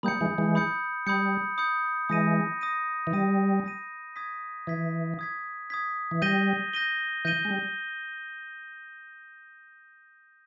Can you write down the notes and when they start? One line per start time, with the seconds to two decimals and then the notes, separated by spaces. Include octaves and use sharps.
0.03 G3 A#3 B5 D#6 G6 C#7
0.21 E3 G#3
0.38 E3 G#3
0.55 B5 D#6 G6 C#7
1.06 G3 B5 D#6 G6 C#7
1.58 B5 D#6 G6 C#7
2.09 E3 G#3 D#6 A#6 D#7
2.61 D#6 A#6 D#7
3.07 E3
3.13 G3 D#6 A#6 D#7
3.64 D#6 A#6 D#7
4.16 D#6 G#6 B6
4.67 E3 D#6 G#6 B6
5.19 D#6 G#6 B6
5.70 D#6 G#6 B6
6.11 E3
6.22 G3 G6 A#6 D#7 G7
6.73 G6 A#6 D#7 G7
7.25 E3 G6 A#6 D#7 G7
7.45 G#3
7.51 G3